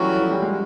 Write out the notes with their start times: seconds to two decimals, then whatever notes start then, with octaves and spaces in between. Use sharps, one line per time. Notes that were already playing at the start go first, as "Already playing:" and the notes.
Already playing: E3 F#3 G3 A3 C#4 F#4
0.20 F3
0.31 G3
0.42 G#3